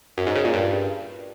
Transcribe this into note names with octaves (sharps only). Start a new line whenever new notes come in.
F#2
G#2
C#3
A#2
G2